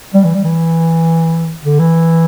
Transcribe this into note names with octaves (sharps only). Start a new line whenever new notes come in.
G3
E3
G3
E3
D3
E3